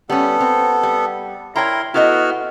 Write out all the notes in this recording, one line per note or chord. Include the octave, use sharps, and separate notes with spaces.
G3 B3 C#4 A4
C4
G3
E4 A#4 C#5 G5 A#5 C6
B3 E4 F#4 A4 D#5 F6